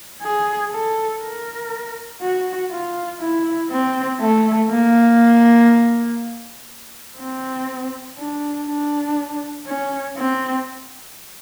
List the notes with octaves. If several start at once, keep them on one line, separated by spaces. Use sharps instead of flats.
G#4
A4
A#4
F#4
F4
E4
C4
A3
A#3
C4
D4
D4
C#4
C4